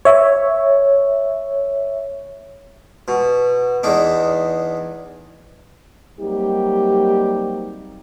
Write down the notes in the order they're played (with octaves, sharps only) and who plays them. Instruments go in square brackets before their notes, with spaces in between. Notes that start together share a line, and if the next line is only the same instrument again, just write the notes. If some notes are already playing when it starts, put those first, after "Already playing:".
[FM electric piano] C#5 E5
[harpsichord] B2
E2 D4 D#4
[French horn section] F#3 G3 A#3 C4 D#4 G4